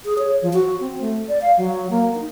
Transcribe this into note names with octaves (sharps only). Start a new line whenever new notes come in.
G#4
C#5
F3
F#4
C4
A3
D5
F5
F#3
A#3
D#4